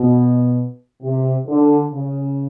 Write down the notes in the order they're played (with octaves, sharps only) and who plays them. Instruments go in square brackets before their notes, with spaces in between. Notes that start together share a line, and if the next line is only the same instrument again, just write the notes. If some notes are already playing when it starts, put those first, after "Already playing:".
Already playing: [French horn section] B2
C3
D3
C#3